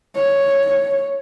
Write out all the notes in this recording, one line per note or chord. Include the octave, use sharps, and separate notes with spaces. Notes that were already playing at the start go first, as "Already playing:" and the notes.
C#5